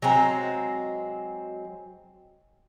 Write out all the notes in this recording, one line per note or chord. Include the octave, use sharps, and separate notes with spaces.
F#3 G#3 C4 A#5